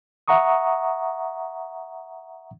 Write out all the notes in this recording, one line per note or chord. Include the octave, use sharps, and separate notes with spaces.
E5 F#5 A#5 C#6 D#6